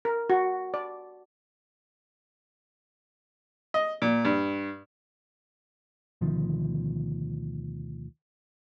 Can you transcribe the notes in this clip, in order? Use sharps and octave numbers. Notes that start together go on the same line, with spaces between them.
A#4
F#4
D5
D#5
A#2
G2
D2 B2 D#3 F3